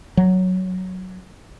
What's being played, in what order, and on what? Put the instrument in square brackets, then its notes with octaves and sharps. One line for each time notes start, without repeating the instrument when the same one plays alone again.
[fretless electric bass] F#3